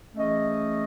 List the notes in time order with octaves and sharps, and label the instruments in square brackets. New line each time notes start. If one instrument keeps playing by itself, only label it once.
[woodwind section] E3 A3 C#4 G#4 D#5